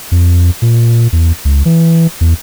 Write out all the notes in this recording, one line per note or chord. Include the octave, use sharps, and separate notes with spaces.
F2
A#2
E2
C#2
E3
E2